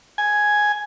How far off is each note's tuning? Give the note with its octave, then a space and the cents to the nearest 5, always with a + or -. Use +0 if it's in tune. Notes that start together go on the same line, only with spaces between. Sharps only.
G#5 +5